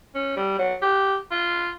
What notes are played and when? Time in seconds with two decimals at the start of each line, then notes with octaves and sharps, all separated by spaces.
0.15 C#4
0.37 G3
0.59 F#3
0.82 G4
1.31 F4